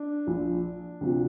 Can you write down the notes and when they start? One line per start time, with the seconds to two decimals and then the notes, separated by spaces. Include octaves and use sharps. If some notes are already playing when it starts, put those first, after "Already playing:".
Already playing: D4
0.27 A#1 A#2 F3
1.01 D2 C3 F3